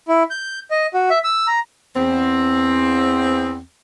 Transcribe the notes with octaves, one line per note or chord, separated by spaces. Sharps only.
E4
G6
D#5
F#4
E5
E6
A#5
E2 C4